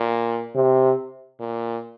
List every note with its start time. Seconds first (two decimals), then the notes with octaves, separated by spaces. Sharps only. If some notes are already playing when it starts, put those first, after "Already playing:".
Already playing: A#2
0.55 C3
1.40 A#2